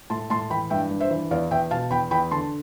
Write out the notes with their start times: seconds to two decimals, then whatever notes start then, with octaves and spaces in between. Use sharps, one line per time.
0.10 A2 A5 C6
0.30 A2 A5 C6
0.50 E3 G5 B5
0.70 G2 E5 G5
0.91 G2
1.00 C5 E5
1.11 E3
1.31 E2 D5 F5
1.51 E2 E5 G5
1.71 B2 F5 A5
1.90 E2 G5 B5
2.11 E2 G5 B5
2.31 D3 A5 C6